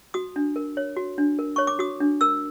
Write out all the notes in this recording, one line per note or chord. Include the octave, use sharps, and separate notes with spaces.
F#4 D#6
D4
A#4
C#5
F#4
D4
A#4
C#5 C#6
D6
F#4 D#6
D4
A#4 E6